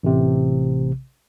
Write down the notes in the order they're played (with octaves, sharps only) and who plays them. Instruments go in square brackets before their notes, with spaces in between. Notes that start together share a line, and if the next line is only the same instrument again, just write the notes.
[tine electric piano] A1 C3